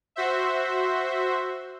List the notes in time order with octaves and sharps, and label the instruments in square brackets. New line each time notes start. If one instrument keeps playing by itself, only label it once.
[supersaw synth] F#4 C5 E5